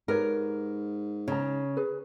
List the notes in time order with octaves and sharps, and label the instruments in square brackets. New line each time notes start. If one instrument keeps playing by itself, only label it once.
[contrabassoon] G#2 [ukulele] G4 B4 C#5 [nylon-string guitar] A#4
[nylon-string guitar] C#3 [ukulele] D#4 A#5
[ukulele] G#4 B4